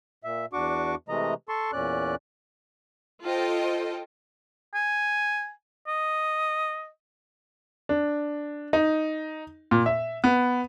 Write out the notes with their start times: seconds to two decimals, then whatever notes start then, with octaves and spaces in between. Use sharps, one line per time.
0.24 A#2 E5
0.53 E2 D4 F#4 C#6 D6
1.09 C3 E3 G#3 A3 D#5 A#5
1.49 A4 A5 C6 C#6
1.73 E2 A#2 C#4 D5 F#6
3.24 F4 A4 C5 D#5 G5
4.74 G#5
5.88 D#5
7.89 D4
8.73 D#4
9.71 A#2
9.86 E5
10.24 B3